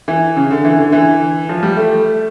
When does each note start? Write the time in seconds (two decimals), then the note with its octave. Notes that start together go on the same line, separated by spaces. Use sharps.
0.08 E3
0.36 C#3
0.51 D3
0.65 E3
0.79 D3
0.92 E3
1.49 F3
1.63 G3
1.77 A3